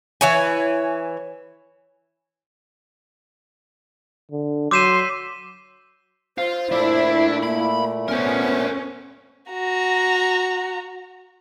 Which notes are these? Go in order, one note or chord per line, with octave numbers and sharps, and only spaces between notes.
E3 C#5 G#5
D3
F#3 C6 D6 E6 G6 B6 D#7 E7
F4 C5
A#2 A3 D4 E4
A#3 B5
B3 C#4 A#4 C5
F#4 A#5